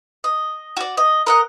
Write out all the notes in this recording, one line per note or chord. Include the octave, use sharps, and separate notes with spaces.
D#5
F#4 D5
D#5
A#4 D#5 F#5